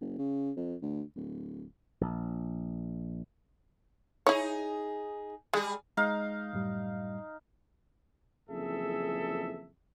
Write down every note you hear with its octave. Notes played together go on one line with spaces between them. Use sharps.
F#1
C#3
F2
D2
D1
A#1
D#4 E4 G#4 C#5
G3 G#3 G#4
G#3 D#4 F5
F#2 A2 G3
F#1 F2 E3 G#4 A4 E5